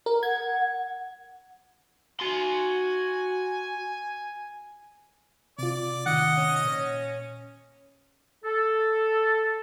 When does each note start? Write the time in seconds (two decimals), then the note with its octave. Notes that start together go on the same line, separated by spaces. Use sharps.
0.06 A#4
0.23 F#5 G#6
2.20 F#4 G#5 C6
5.58 C3 F4 D5
6.06 A2 C3 D#3 D#5 F#5
6.37 C#4
6.64 A#2 C#5
8.44 A4